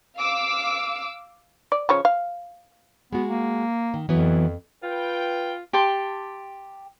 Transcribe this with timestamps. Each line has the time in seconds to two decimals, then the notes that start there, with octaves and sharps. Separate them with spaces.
0.15 F5 D6 E6
1.72 D5
1.89 C#3 F3 C#5
2.05 F5
3.13 G#3 B3 F#4
3.29 A#3
3.94 D#3
4.09 F2 E3 F#3 B3
4.83 F4 B4 G5
5.73 G4 G5 A5 C6